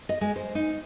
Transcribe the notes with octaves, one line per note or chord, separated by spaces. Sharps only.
D#5
G#3
C5
D#4